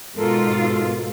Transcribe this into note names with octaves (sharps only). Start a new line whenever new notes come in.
G#2 B2 F4 A4 A#4